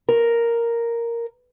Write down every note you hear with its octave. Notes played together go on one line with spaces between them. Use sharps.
A#4